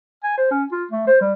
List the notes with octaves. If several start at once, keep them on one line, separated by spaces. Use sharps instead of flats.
G#5
C5
C#4
F4
A3
C5
G3